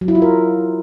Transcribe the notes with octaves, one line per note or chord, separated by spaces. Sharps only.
F#3
E4
F4
A#4